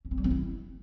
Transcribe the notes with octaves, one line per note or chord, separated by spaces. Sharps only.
C#4
C4
G3
C4
E4